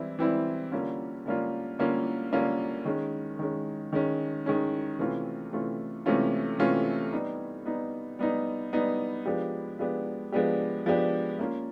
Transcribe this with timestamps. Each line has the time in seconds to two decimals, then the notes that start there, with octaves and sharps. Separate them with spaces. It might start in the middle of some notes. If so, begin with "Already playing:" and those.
Already playing: E3 G3 C4 E4
0.19 E3 G3 C4 E4
0.72 D3 G3 A#3 C#4 F4
1.26 D3 G3 A#3 C#4 F4
1.79 D3 G3 A#3 C#4 F4
2.33 D3 G3 A#3 C#4 F4
2.85 D#3 G#3 C#4
3.39 D#3 G#3 C#4
3.92 D#3 G#3 C#4
4.46 D#3 G#3 C#4
4.99 C3 E3 A3 C#4 F4
5.52 C3 E3 A3 C#4 F4
6.06 C3 E3 A3 C#4 F4
6.59 C3 E3 A3 C#4 F4
7.13 G3 B3 D#4
7.66 G3 B3 D#4
8.19 G3 B3 D#4
8.73 G3 B3 D#4
9.26 F3 G#3 B3 D4 G4
9.79 F3 G#3 B3 D4 G4
10.32 F3 G#3 B3 D4 G4
10.86 F3 G#3 B3 D4 G4
11.39 A#3 C#4 F4